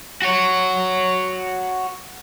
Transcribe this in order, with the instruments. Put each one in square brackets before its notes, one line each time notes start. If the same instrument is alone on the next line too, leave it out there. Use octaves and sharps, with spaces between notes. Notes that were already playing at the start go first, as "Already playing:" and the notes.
[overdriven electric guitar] F#4 C#5